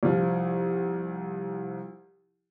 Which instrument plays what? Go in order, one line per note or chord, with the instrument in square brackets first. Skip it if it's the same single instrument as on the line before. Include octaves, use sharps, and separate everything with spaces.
[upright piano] C2 F3